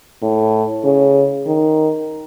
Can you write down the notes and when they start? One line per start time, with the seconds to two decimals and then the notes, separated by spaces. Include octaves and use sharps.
0.22 A2
0.84 C#3
1.46 D#3